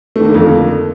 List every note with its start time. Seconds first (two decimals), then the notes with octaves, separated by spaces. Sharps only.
0.16 A3
0.20 D#3
0.25 A#3
0.30 D3
0.34 F2